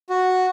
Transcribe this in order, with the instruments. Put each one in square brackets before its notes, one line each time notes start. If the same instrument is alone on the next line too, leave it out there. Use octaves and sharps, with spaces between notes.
[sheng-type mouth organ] F#4